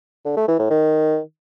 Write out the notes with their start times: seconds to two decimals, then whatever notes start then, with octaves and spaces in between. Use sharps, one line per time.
0.25 D3
0.37 A3
0.48 E3
0.59 A2
0.70 D#3